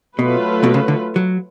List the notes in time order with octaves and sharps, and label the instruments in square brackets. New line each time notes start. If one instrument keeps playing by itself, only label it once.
[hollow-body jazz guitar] B2 [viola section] F#3 A3 F4 B4
[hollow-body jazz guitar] B2
C#3
D3
F#3